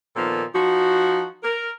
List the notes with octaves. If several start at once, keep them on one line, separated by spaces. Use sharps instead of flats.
A#2 D#3 F3 B3 A4
F3 D#4 F#4
A#4